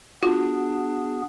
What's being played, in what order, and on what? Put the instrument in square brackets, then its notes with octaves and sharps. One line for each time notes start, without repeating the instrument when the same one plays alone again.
[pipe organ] B3 G#4 [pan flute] D4 [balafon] F4 [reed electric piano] F#4